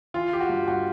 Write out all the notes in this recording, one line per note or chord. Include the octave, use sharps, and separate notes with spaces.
E3 F4
E3 G4
F#4
G2
G2 F#4